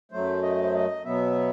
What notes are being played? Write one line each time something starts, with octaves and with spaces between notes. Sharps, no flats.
F#2 F#3 A3 C5
D#5
C5
D#5
B2 F#3 B3 E5